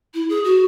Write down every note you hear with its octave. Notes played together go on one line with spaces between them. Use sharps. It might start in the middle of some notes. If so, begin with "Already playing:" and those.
E4
G#4
F#4